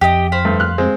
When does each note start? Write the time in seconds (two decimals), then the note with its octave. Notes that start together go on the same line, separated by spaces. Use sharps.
0.01 F2 G4 D#5
0.32 C5 F5 B5
0.45 G2 A3
0.60 F6 F#6
0.78 G#3 C4